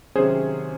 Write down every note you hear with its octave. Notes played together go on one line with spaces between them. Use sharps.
C3 D#3 F#3 C#4 G#4 C5